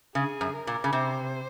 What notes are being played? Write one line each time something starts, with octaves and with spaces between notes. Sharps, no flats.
C#3 G#4
F#2
A#4
A#2
C#3
C3 C5